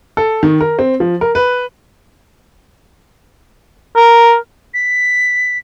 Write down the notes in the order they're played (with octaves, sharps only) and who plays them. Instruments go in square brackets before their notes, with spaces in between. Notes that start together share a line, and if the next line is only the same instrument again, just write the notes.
[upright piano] A4
D#3
A#4
C4
F3
A#4
B4
[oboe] A#4
[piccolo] B6